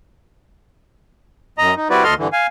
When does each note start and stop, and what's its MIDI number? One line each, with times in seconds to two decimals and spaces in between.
1.58 1.74 42
1.58 1.74 75
1.58 1.74 82
1.77 1.88 63
1.90 2.04 55
1.90 2.04 60
1.90 2.04 64
1.90 2.04 66
1.90 2.04 71
1.90 2.04 74
2.04 2.14 38
2.04 2.14 69
2.04 2.14 75
2.04 2.14 84
2.04 2.14 89
2.18 2.28 43
2.18 2.28 50
2.18 2.28 52
2.33 2.47 77
2.33 2.47 80